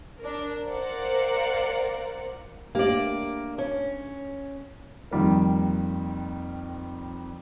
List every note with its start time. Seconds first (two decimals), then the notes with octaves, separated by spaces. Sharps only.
0.20 D4 A#4
0.66 A#4 C5 D5 F5 F#5
2.75 A3 A#3 D4 G4 D5
3.58 C#4
5.11 F2 D#3 G3 A#3